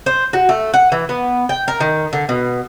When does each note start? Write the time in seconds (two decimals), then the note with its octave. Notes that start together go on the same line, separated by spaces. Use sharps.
0.06 C5
0.33 F#4
0.49 A3
0.74 F#5
0.92 E3
1.09 B3
1.49 G5
1.68 A#4
1.80 D#3
2.13 D3
2.29 B2